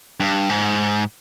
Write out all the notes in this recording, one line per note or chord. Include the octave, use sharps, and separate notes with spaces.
G2
G#2